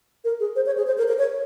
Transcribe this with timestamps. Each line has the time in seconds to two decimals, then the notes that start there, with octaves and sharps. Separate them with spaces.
0.24 A#4
0.40 G#4
0.56 C5
0.66 C#5
0.77 G#4
0.87 C5
0.98 A#4
1.08 A#4
1.19 C#5